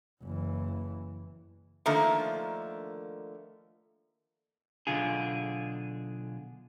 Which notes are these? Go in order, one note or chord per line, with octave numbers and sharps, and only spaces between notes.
F#1 E3
D3 D#3 F3 A3 A#3
B1 D3 F4 G#4